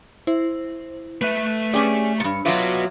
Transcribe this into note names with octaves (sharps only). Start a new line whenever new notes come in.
E4 C5
A3 B4 E5 F#6 D#7
C#4 G4 G#4 D5
G2 A#2 C#7
F#3 F4 F#4 B4 E5 D6